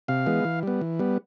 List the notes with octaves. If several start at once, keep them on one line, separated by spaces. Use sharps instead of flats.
C3 F5
E3 G#3 B3
E3
G3 B3
E3
G3 B3